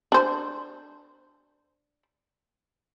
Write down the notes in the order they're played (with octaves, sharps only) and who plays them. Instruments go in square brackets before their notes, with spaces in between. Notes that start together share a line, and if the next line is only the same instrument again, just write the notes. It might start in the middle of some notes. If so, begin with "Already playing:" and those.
[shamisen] D4 C5